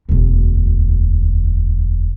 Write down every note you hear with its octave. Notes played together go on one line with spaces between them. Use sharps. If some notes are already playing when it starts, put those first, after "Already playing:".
E1 D2